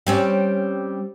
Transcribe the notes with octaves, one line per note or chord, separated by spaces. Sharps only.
G3 C4 C#4